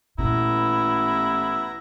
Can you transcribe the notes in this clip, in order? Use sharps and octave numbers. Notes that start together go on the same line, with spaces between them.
A1 A#2 B3 E4 A#5